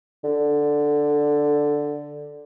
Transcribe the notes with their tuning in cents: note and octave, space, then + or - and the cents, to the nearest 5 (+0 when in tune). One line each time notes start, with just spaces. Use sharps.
D3 +0